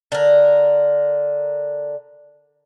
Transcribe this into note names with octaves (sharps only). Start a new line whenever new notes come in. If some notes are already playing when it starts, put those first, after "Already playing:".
D3 A#4